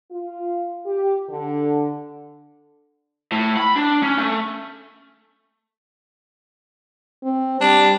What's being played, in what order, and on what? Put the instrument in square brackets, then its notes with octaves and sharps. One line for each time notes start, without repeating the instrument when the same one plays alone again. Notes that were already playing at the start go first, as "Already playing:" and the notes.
[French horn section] F4
G4
D3
[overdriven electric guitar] A2
B5
D4
C#4
A3
[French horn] C4
[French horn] G3 [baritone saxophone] D4